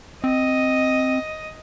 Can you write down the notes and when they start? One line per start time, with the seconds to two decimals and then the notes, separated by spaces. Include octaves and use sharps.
0.24 C4 D#5